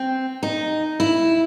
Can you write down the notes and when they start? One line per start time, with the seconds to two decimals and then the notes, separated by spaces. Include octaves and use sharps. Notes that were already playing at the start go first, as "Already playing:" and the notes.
Already playing: C4
0.43 D#4
1.00 E4